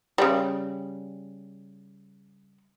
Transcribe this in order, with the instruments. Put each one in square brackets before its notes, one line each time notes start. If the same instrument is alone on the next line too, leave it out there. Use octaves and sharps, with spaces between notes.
[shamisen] C#3 G3